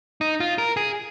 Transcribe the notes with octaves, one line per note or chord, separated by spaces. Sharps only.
D#4
F4
A#4
G#4